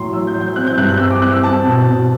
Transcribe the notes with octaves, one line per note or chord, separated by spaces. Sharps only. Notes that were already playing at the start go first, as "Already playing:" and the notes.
Already playing: A2 F#3 C6
F#3 E6
G6
F#3
G6
C4 F#6
G6
G2 F#6
F#6
C4 E6
D6
C4 F#6
E6
C4 A5
B2
B2